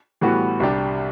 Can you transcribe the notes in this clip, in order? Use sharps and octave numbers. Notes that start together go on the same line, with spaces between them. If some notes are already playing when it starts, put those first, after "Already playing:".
A2 E3 G3 B3 F#4
C2 C3 G3 D4 G4